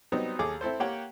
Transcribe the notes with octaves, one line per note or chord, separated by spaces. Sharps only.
F#3 G3 B3 C4 D#4
D#2 G#4 A4 D6
C4 E4 A4 C5
A#3 G4 C#5 F#5 G5